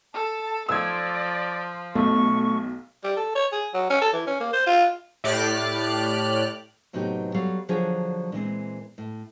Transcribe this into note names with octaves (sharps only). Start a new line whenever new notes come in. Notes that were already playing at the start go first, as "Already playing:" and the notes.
A4 A5
F3 D5 E6 G#6
B1 A3 C#6
G3
A4
C#5
G#4
F#3
C#4
A4
E3
C#4
A#3
C5
F4
A2 G4 D5 F6 F#6
A2 C3 F#3 B3 D#4 G4
F#3 G3 A4 F5
D3 F3 F#3 D4 F4 G#4
A#2 E3 G#3 C4
A2